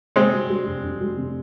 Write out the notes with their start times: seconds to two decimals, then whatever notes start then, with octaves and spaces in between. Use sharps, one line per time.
0.16 C3 G#3 C4
0.33 G3
0.50 G3
0.67 F1
0.84 F1
1.01 G3
1.18 C3